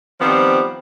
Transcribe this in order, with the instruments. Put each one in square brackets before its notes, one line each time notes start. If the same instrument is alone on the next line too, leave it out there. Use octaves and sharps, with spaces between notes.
[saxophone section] D#3 F3 G3 B3 C4